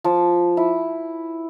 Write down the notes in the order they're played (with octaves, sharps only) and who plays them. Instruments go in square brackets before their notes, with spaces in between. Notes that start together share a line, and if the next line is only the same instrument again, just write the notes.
[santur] F3
E4